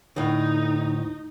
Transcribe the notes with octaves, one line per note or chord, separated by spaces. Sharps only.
D2 A2 D#4